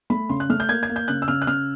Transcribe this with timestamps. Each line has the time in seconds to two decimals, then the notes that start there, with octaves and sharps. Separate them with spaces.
0.10 A3 B5
0.29 C#3 C6
0.40 F#6
0.49 A3 F6
0.60 G6
0.69 A#3 G#6
0.83 G#6
0.89 A#3
0.96 G6
1.08 C#3 F#6
1.22 E6
1.28 C#3 F6
1.42 F#6
1.47 C#3 F6